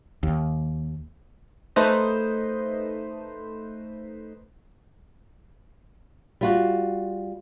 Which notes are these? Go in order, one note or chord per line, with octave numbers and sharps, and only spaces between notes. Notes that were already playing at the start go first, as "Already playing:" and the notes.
D#2
A3 D#4 B4 C5 D#5
G3 F4 F#4